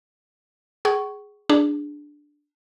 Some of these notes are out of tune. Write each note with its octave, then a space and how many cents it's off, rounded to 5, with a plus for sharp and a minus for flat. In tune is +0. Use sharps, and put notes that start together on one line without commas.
G#4 +0 F#5 +45 C#6 +0
D4 +0 G#4 +0